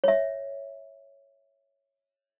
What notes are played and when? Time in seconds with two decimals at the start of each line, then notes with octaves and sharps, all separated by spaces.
0.04 C#5 E5